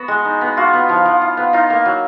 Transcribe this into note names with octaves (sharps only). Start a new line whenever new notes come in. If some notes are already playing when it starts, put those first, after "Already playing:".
Already playing: B3 F#4
G#3
D#4
B3
F4 F#4
B3
F3
F3
F4
B3
D#4 F4
A#3
F#3